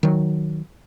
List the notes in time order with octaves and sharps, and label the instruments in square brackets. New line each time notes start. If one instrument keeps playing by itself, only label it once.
[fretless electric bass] D#3 F#3